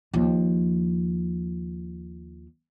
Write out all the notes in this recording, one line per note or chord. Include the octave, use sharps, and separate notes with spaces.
D#2 F3